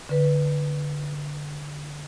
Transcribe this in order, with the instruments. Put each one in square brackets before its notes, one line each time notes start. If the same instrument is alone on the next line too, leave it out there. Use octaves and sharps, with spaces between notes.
[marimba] D3 B4